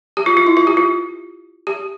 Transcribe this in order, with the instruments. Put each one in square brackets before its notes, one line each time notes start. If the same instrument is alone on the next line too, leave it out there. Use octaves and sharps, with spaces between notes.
[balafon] G4
F4
F4
E4
F4
G4
F4
G4